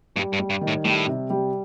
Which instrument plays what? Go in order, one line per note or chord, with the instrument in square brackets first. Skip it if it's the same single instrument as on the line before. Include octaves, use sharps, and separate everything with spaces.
[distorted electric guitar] G2 [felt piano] G3
[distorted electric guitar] G2
[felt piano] G3
[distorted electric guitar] G2
[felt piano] D#3
[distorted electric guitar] A2
[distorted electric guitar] A2 [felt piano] G3
[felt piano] C3
G3